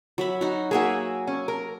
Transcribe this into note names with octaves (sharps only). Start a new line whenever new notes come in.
F#3 E5 B5
D#4 F#4
A#3 F#4 G#4 E5 G#5
C#4
A#4